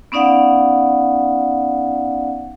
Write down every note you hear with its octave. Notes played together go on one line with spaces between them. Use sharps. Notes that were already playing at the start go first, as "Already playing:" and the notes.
B3 C#4 D#4 D5 F5 F#5